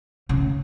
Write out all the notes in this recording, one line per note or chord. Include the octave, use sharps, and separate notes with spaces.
C#3